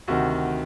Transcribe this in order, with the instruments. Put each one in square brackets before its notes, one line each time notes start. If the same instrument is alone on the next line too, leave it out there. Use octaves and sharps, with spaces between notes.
[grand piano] D2 C3 D#3 F#4